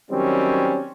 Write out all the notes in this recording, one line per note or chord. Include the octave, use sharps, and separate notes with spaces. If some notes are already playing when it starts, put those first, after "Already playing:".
D#3 F#3 G3 C4 C#4